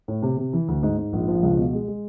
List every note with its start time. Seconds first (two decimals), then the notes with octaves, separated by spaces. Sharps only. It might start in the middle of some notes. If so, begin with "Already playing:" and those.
0.08 A2
0.22 C3
0.37 C3
0.53 E3
0.68 D2
0.83 G#2
0.97 G#2
1.13 A#1
1.28 F3
1.43 C#2
1.57 B2
1.73 G#3
1.88 G#3